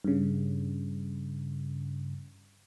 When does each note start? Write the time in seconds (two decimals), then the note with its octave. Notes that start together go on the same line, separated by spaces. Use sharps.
0.04 G2 C#3